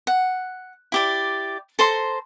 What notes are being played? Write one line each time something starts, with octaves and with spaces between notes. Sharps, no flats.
F#5
E4 G4 D5
A4 C5 A#5 C6